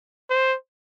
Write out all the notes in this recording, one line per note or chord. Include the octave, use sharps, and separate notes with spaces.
C5